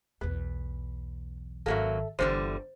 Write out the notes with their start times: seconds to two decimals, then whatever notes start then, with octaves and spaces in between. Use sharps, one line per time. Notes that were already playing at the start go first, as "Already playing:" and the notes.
0.21 B1 E2 B4
1.66 G#1 F#2 D#3 F#3 A#3 A4 E5
2.19 G1 E2 D3 G3 D4 C5